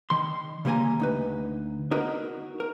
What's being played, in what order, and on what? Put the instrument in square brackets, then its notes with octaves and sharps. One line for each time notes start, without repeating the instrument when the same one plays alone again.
[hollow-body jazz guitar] D#3 C6
C#3 G3 A#3 A#4 G#5 A#5
D2 D#4 B4
B3 D#4 F#4 A#4 B4
A#4